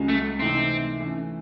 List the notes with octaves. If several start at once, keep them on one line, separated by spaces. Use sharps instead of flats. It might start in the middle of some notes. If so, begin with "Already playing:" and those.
Already playing: C#2 C#3 G#3 C#4 F#4
A3
C3 E3 A3 C4 D#4
E3 A3 C#4